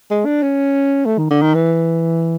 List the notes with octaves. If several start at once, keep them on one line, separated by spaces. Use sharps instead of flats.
G#3
D4
C#4
A3
D#3
D3
D#3
E3